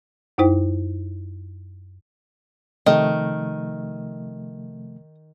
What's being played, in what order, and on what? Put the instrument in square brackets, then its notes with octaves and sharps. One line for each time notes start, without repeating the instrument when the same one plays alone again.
[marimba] F#2 D#4 E4 C5 G5
[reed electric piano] C3 F3 A3 [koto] D#3 [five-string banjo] D#5